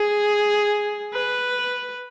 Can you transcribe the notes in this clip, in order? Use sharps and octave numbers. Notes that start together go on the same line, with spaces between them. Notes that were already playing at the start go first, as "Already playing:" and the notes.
Already playing: G#4
B4